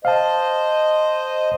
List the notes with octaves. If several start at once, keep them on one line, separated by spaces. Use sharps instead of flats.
C5 D#5 F5 A5